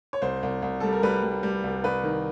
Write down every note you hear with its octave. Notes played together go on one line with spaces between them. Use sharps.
C#5
C2 C5
C2
C2
G3 A4
A#4
G3 B4
G3
G3
C2
C2 B4
D#3